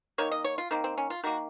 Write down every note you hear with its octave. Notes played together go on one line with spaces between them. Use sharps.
D#3 A#3 C#5
D#5
C#5
F4
D#3 A#3 C4
C4
C#4
F4
D#3 A#3 F#4